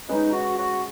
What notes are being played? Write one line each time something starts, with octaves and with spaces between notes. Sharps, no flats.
G#3 C#4 D#4 G#4 B4
F#4
F#4